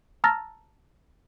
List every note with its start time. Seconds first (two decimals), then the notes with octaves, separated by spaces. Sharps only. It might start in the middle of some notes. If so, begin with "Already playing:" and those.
0.24 A5 A#5 E6 F6 A6 A#6